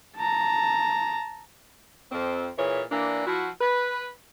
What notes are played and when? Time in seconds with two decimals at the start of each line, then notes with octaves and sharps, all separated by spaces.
0.17 A5 A#5
2.12 F2 C4
2.58 A#2 E3 G#4 C#5
2.91 E3 A#3 D4
3.27 F3 E4 F#4
3.61 B4